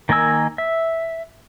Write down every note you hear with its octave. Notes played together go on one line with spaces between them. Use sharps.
D#3 A#3 D#5 G#5 E6
E5